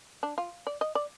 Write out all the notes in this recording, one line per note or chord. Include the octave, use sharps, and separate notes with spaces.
D4
F4
D5
D#5
D5